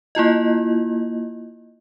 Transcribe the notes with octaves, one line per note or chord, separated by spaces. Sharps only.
A#3 E4 F4 D#5